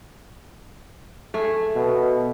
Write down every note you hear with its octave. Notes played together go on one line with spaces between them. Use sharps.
A3 G#4
B2